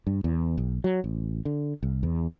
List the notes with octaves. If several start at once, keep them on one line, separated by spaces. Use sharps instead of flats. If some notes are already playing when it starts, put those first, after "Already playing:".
G2
E2
B1
F#3
A1
D3
C2
E2